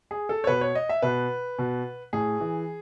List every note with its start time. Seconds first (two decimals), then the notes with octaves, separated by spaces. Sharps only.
0.11 G#4
0.29 A4
0.44 C#5
0.47 B2 B4
0.61 C#5
0.75 D#5
0.89 E5
1.02 B2 B4
1.58 B2
2.13 A2 G#4
2.40 E3